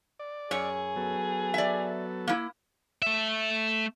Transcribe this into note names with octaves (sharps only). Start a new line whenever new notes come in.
D5
F#2 G#4 C#5
F#3 B3 A4
D5 E5
A#3 E4
A3 E5